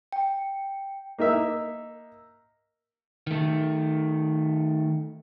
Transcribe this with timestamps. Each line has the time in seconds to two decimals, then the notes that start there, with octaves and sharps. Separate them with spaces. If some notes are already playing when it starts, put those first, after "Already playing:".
0.12 G5
1.19 A#3 D#4 A#4 E5
3.27 D#3 A3